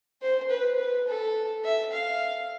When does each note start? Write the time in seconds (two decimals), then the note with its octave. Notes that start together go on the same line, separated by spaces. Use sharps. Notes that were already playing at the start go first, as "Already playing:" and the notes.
0.22 C5
0.50 B4
0.79 B4
1.08 A4
1.64 E5
1.92 F5